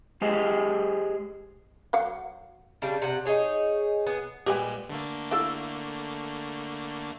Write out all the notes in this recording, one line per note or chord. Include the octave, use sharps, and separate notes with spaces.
G#3 G4 G#4 C5 D#5
F#3 F5 F#5
C#3 G3 D4
C3 F#5
D#4 G#4 C#5
B3 G#4
A#2 G3 G#3 G4 B4 G#5
D3 A3 A#3
E4 F4 A4